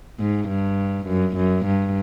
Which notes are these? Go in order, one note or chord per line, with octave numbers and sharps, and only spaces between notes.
G#2
G2
F#2
F#2
G2